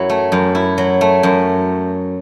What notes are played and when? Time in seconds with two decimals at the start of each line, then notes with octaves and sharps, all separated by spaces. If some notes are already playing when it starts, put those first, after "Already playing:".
Already playing: F#2 F#3 E4
0.10 A3
0.32 F#2
0.55 E4
0.78 F#3
1.01 A3
1.23 F#2